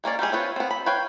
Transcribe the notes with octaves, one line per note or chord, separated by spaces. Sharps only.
G#3 A#3 C#4 D5
G3 G#3 G4 G#4
C4 F4 B4 C#5
B3 C4
B5
B4 C#5 F5 G5